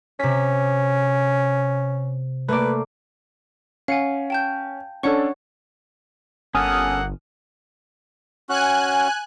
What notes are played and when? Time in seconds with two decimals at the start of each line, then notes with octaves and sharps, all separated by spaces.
0.19 C3 C#4 B6
2.48 A3 A#3 B4 D5
3.88 C#4 F5 F#5 G#5
4.30 G5 A5 G6
5.03 C#4 D4 A4 C#5 F#5 C#6
6.55 G1 A#3 C#4 A4 F#5 G#5 D#6 F6
8.49 C#4 F#4 G#5 F#6